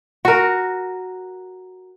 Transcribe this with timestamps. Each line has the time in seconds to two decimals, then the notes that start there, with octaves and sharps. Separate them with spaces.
0.25 F#4 A#4